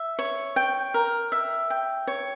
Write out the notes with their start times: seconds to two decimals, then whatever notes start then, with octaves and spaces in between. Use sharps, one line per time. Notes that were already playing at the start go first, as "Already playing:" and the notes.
Already playing: E5
0.19 C#5
0.56 G5
0.94 A#4
1.32 E5
1.70 G5
2.07 C#5